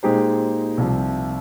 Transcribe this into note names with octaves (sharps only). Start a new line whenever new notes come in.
A#2 G#3 D#4 G4 C5
C2 C3 F3